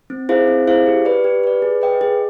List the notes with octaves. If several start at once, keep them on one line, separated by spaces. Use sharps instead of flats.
C4
E4 G#4 C5 F5
C4
E4 G#4 C5 F5
G4
B4 D5
G4
B4 D5
G#4
B4 D#5 G5
G#4